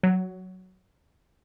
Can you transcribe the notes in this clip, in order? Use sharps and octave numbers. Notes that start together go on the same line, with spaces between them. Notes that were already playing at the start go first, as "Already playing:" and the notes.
F#3